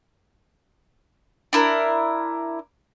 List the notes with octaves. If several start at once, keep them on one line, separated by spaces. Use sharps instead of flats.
D4 E4 A#4